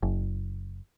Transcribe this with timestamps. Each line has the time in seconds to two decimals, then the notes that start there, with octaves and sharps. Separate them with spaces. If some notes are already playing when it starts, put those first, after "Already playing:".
0.03 F#1